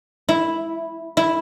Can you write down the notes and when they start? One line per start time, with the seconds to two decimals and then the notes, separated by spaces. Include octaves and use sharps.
0.29 E4
1.17 E4